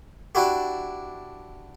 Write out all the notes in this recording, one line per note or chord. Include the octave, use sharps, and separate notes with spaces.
D4 E4 F#4 G4